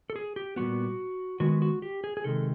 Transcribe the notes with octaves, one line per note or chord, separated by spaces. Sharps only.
A4
G#4
G4
A#2 G3 B3 F#4
D#3 G#3 B3 F#4
F#4
G4
G#4
G#4
C3 D#3 G#3 A4